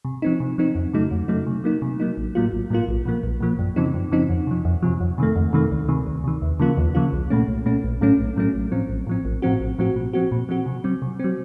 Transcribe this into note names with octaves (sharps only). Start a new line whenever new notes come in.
C3
F3 C4 D#4
C3
F3 C4 D#4
F2
C#3 F#3 A3 D#4
F2
C#3 F#3 A3 D#4
C3
F#3 A#3 D#4
C3
F#3 A#3 D#4
A1
A2 F#3 A#3 F4
A1
A2 F#3 A#3 F4
A#1
A#2 F3 A#3
A#1
A#2 F3 A#3
F#2
C#3 F3 C4 D#4
F#2
C#3 F3 C4 D#4
F2
C3 F3
F2
C3 F3
F2
C3 D#3 A3
F2
C3 D#3 A3
C#2
C3 D#3
C#2
C3 D#3
D#2
C#3 F3 A#3 F4
D#2
C#3 F3 A#3 F4
C2
A#2 A3 C#4
C2
A#2 A3 C#4
A#1
A2 F#3 A3 C#4
A#1
A2 F#3 A3 C#4
A1
A2 F3 C4
A1
A2 F3 C4
A1
A2 F3 C4 F#4
A1
A2 F3 C4 F#4
A#2
F3 C4 F#4
A#2
F3 C4 F#4
C3
F#3 C4
C3
F#3 C4